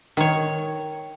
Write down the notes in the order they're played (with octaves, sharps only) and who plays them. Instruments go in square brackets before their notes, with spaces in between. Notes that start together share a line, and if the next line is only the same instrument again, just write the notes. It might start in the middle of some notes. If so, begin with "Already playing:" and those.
[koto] D#3 C#5